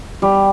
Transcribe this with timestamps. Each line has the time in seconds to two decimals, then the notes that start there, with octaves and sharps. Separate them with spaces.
0.22 G3